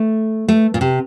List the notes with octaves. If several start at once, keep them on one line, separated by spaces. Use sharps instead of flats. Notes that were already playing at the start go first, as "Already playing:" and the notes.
Already playing: A3
A3
A#2
C3